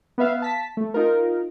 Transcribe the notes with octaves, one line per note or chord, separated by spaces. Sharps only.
B3 B4 E5 F5
A5 B6
A3
D#4 F4 A#4